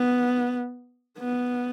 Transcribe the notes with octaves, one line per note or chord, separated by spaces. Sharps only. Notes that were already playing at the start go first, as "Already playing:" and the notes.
Already playing: B3
B3